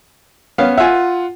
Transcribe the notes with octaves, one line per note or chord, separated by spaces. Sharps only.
B3 C#4 F5
F4 E5 F#5 G#5